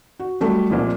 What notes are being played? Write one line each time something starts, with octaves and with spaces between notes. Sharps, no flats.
F#4
F#3 G3 A3
C2 A#2 F3 G#3